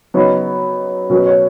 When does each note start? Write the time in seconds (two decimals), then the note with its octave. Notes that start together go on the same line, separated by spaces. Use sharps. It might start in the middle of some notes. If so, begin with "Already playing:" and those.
0.14 C#3 F#3 B3 D#4 C#5
1.10 B2 F#3 C#4 B4
1.26 C#5